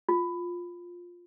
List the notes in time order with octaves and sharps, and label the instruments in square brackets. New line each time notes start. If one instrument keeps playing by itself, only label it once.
[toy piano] F4